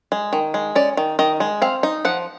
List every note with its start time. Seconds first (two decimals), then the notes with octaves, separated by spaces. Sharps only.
0.12 G#3
0.33 D#3
0.54 G#3
0.75 C#4 D5
0.97 D#3
1.19 D#3 D#5
1.40 G#3
1.62 C4 F5
1.83 D#4
2.05 F3 F#5